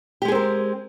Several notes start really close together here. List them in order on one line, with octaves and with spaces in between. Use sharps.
G4 G#3 G#4 C4 A#4